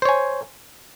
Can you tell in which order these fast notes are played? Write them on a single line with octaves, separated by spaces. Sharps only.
C5 C#5 G#5